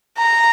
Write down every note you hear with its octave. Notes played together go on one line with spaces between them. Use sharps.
A#5